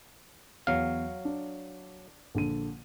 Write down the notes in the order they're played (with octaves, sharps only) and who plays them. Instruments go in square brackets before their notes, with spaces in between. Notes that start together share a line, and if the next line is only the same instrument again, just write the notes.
[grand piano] E2 [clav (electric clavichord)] F#3 F5
[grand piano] D4
A#1 D3 D#7